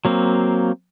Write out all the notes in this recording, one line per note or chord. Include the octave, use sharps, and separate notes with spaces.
F#3 A#3 C4